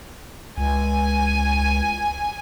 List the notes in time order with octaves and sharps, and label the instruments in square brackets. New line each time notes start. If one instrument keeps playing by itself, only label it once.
[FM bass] C#2 [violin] G#5